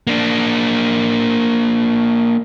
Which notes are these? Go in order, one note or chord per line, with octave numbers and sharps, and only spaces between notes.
A#3 D4